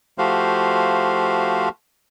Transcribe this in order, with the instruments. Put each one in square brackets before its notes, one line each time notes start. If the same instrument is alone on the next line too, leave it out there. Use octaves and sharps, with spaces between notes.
[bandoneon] F3 A3 F#4 G4 C5 F5